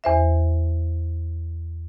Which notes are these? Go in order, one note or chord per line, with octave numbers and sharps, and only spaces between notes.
E2 C5 E5